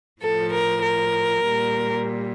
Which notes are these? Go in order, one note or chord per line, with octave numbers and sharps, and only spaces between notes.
A2 F3 A4
A#4
A#4
A#2 G3